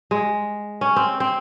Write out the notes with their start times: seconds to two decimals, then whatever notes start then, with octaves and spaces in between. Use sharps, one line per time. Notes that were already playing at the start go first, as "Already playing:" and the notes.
0.11 G#3
0.81 C#4
0.96 C4
1.20 C4